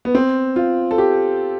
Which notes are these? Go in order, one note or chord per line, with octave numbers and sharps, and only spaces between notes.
B3
C4
F4
A4
G4